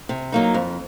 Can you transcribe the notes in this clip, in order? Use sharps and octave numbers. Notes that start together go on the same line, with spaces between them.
C3
F#3 A#3 D#4
F2